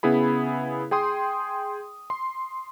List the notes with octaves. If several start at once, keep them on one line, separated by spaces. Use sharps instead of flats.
C#3 B3 E4 G#4 B5
G#4 G5 C6 D#6
C6